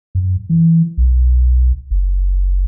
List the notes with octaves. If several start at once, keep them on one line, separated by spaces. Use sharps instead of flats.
F#2
E3
B1
F#1